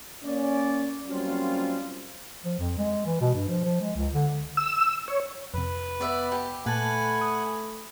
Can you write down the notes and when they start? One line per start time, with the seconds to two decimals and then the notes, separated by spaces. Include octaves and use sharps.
0.24 A#3 C#4 D5
1.08 F#3 G3 A#3 C4 C#4 F4
2.45 F3
2.59 F2
2.78 G#3
3.06 E3
3.21 B2
3.34 G2
3.48 F3
3.64 F3
3.81 G#3
3.96 C#2
4.14 D3
4.57 E6
5.08 C#5
5.54 F2 C3 B4
6.01 B3 D5 E5
6.32 G4
6.66 A#2 A3 B4 F#5 G#5 A5
7.21 D#6